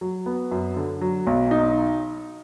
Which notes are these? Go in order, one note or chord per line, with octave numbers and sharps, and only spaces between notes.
F#3
B3
F#2
D3
F#3
B1
D#4